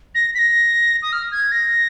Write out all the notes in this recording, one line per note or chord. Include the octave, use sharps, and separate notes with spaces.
A#6
B6
A#6
D#6
F6
G#6
A#6